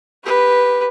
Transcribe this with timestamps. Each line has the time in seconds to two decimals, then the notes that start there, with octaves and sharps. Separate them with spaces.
0.24 G4 B4